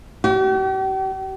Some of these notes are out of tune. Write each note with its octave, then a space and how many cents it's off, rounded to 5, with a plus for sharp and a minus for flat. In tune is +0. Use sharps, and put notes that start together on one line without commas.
G4 -45